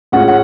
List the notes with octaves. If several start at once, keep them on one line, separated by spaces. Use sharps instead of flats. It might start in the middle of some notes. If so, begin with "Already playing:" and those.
A2 G#3 C#4 F4 F#5
F#5